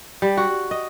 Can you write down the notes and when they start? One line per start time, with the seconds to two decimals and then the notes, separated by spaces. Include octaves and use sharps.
0.22 G3
0.37 F#4
0.71 D#5